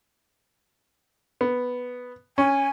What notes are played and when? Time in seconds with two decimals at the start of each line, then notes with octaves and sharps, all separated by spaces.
1.41 B3
2.38 C#4 G#5